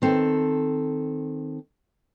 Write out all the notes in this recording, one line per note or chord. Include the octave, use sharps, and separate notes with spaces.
D#3 C4 A4